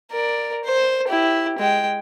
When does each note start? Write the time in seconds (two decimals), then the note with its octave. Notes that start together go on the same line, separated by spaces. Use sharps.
0.12 A#4 D5
0.65 C5
1.08 E4 G4
1.59 G#3 G5